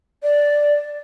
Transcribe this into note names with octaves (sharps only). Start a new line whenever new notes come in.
D5